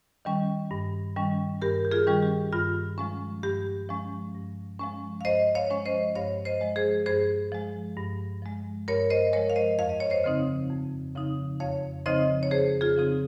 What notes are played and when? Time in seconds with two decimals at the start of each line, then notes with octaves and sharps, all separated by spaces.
0.25 D#3 G3 C#4
0.71 G2
1.16 D#3 G3 C#4
1.62 G2 G4 A#4
1.85 G4
1.92 F4 G#4
2.07 D#3 G3 C#4
2.23 G4
2.52 G2 F4
2.98 F3 G#3 C#4
3.43 G2 G4
3.89 F3 G#3 C#4
4.35 G2
4.79 F3 G#3 C#4
5.21 F5
5.25 G2 C5 D#5
5.55 C#5 F5
5.70 F3 G#3 C#4
5.85 C5 D#5
6.15 G2 C#5 F5
6.45 C5 D#5
6.61 F3 G#3
6.76 G#4 C5
7.06 G2 G#4 C5
7.52 F3 G#3
7.97 G2
8.42 F3 G#3
8.88 G2 A#4 C#5
9.10 C5 D#5
9.33 F3 G#3 A#4 C#5
9.50 F5
9.56 C5 D#5
9.79 F2 F5
9.89 D#5
10.00 C#5
10.10 C5 D#5
10.24 C#3 F3 C4 D#4
10.70 F2
11.15 C#3 F3 C4 D#4
11.60 F2 C#5 F5
12.06 C#3 F3 C4 D#4 C5 D#5
12.43 C#5
12.51 F2 G#4 C5
12.81 F4 G#4
12.97 C#3 F3 C4 D#4